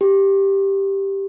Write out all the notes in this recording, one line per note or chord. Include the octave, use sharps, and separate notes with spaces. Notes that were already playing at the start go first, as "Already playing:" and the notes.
G4